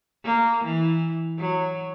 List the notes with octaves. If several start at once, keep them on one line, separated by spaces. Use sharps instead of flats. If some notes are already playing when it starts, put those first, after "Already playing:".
A#3
E3
F#3